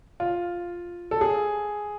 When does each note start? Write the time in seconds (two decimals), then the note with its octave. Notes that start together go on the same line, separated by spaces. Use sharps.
0.20 F4
1.11 A4
1.21 G#4